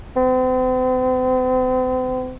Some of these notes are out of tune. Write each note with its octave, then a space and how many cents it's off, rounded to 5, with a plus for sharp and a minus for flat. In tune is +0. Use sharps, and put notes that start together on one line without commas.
C4 -40